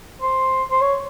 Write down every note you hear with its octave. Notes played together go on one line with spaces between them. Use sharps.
C5
C5
C#5